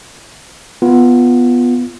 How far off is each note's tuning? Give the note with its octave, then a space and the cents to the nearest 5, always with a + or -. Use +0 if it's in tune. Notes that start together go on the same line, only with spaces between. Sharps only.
B3 +0 F4 +0